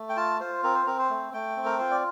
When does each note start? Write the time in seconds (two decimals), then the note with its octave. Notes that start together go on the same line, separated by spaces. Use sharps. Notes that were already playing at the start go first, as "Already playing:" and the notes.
Already playing: A3
0.09 G5
0.16 F4 A5
0.40 F4 C5
0.63 C4 A#4
0.75 C5
0.86 C4 A#4
0.99 C5
1.10 A3
1.33 A3 G5
1.57 C4
1.65 A#4
1.78 F4 C5
1.91 D5